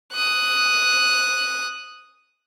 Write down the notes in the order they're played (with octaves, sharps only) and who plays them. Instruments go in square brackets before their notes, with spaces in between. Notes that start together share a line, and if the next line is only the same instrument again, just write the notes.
[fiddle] D#6 F#6